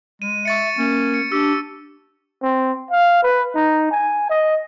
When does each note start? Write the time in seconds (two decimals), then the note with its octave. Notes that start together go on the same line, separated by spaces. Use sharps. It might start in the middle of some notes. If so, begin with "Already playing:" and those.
0.22 G#3 D#7
0.45 E5 C#6 A6 C#7
0.78 A#3 C#4
1.14 C#7
1.32 D4 G4 E6
2.42 C4
2.91 F5
3.23 B4
3.55 D#4
3.91 G#5
4.30 D#5